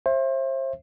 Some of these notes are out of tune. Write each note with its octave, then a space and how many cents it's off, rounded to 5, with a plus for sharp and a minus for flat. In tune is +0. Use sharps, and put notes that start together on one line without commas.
C5 +35 E5 +20